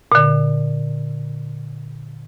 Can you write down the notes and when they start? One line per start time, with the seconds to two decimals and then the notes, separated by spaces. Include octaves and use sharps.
0.12 A#2 D3